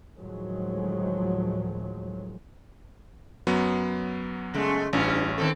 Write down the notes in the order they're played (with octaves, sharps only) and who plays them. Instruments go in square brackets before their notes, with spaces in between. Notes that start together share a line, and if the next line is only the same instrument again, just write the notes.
[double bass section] D2 A2 D#3 F3 F#3 G#3
[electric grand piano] F#2 F#3 B3
[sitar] C#3 G#3 A3
[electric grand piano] A1 [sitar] G2 C#4 F4
[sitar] D#3 C4 A4